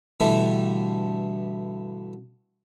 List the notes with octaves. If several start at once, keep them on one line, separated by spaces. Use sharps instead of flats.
G2 B2 D3 E3 G3 A3